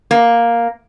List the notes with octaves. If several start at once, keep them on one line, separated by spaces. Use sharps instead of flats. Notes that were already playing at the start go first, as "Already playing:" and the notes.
A#3